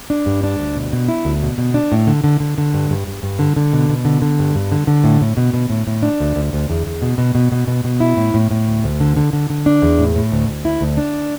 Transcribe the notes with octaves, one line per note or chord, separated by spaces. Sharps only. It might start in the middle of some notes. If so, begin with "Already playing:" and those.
D4
G2
D4
D2
B2
B2
E4
D2
B2
B2
D4
A2
D3
D3
D3
D3
G2
G2
G2
G2
D3
D3
B2
B2
D3
D3
G2
G2
D3
D3
A2
A2
B2
B2
A2
A2
D4
D2
D2
D2
E2
E2
B2
B2
B2
B2
B2
B2
E4
A2
A2
A2
D2
D2
D3
D3
D3
D3
D4
E2
A2
A2
D2
D2
E4
D2
D4